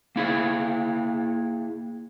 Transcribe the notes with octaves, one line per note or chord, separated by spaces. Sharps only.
A#3 E4 G#4